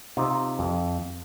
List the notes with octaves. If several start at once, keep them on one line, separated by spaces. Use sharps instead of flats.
C3 D#4 F4
F2